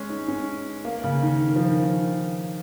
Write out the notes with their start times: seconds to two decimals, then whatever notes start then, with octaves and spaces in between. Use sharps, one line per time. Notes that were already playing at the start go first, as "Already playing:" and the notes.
Already playing: G#3 C#4
0.09 D#4
0.28 C#4
0.85 A#3
1.04 C#3
1.23 D#3
1.48 D#3
1.55 F3
1.70 D#3
1.84 D#3